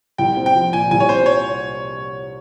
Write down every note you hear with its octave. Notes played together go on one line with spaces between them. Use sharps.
C2 G5
C4
G5
F3
A#2 G#5
C2 G#5
C#5
C4 C5
C#5